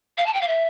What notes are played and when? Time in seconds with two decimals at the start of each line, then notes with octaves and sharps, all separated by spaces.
0.18 F5
0.26 A5
0.34 G5
0.41 F5
0.48 E5